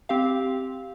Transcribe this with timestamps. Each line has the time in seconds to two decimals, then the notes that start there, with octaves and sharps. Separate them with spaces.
0.09 C4 G4 F5